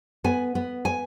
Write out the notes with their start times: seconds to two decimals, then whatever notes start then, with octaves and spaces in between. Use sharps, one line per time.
0.24 B3 G#5
0.55 B3
0.85 G#5